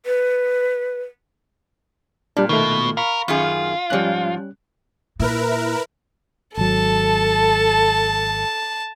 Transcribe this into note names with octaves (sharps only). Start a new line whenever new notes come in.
B4
A#2 G3 D4
B2 D#3 A3
A#4 F5 B5 C#6
F#2 D#3 F4 G#4
G#2 F3 G3 C#4 F#6
A#2 E4 A#4 B4
G#1 F#3 A4 A5